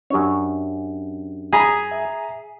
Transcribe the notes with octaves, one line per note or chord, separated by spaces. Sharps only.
F#2 C#4 D4 G4 C#5
G#4 G#5 A#5 B5
E5